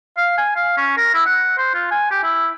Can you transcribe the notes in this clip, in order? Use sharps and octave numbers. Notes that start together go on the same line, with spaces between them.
F5
G#5
F5
C#4
A#4
E4
F#5
C5
F4
G#5
G4
E4